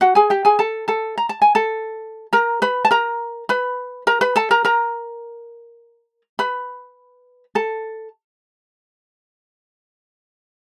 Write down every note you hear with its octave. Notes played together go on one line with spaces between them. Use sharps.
F#4 F#5
G#4 G#5
G4 G5
G#4 G#5
A4 A5
A4 A5
A#5
A5
G#5
A4 A5
A#4 A#5
B4 B5
A5
A#4 A#5
B4 B5
A#4 A#5
B4 B5
A4 A5
A#4 A#5
A#4 A#5
B4 B5
A4 A5